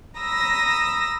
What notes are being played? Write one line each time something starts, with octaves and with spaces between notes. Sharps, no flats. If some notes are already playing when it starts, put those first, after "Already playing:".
A#5 B5 D#6 E6 A#6